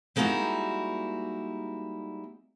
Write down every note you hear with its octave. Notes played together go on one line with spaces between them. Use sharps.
G3 G#3 A#3 D#4 E4 F#4